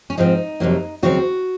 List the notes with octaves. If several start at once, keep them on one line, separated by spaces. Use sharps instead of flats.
C#4
G#2 F3 C4 D#4
F2 C3 F#3 A#3
D#2 C#3 F#3 C4 F#4